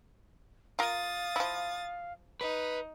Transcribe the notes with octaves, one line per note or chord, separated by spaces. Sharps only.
F4 A#4 F5 D#6 A6
F3 E4
D#4 B4